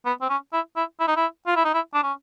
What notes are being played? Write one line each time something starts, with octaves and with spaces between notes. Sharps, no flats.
B3
C4
C#4
E4
E4
E4
D#4
E4
F4
E4
D#4
E4
D4
C#4